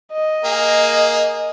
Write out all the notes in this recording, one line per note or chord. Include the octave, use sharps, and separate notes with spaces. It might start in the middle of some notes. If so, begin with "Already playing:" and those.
D#5
A#3 G#4